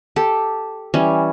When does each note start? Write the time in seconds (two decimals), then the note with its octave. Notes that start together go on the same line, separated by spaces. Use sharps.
0.16 G4 A4
0.94 E3 G3 C#4